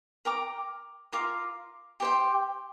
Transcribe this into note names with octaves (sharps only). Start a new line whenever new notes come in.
A#4 G5 A#5 D6
F4 A#4 F5 D6
G4 C5 G5